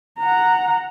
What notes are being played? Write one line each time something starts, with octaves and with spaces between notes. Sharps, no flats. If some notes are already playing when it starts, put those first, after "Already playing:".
F#5 A#5